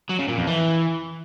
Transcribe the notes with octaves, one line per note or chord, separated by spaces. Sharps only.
F#3
C#3
A#2
F2
E3